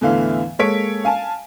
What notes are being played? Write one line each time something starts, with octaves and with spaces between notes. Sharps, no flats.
E2 A2 D3 E3 E5 F5
G#3 A#3 A4 C#5 B6 D7
F5 G#5 A5